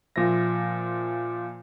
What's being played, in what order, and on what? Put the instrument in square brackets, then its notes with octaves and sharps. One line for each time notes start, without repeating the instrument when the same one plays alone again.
[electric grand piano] A#2 F3 C5 E5 A#6